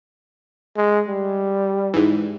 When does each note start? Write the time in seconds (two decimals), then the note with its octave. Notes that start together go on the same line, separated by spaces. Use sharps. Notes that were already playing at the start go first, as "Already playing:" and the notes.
0.77 G#3
1.08 G3
1.94 G#2 E3